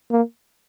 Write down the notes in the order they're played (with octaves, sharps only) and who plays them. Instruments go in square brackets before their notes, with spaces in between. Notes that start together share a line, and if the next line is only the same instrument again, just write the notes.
[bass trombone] A#3